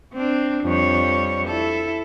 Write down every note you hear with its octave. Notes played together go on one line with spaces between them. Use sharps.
C4 D4
F2 G3 C#5
E4 A4